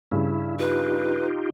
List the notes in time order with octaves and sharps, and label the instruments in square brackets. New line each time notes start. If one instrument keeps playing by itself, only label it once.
[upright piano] G2 C#3 [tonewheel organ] E4
[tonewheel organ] D#4 F4 G4 [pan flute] B4